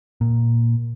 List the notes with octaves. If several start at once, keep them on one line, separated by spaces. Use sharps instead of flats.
A#2